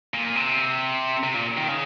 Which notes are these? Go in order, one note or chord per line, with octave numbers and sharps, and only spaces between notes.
A#2
C3
C3
A#2
D#3
C#3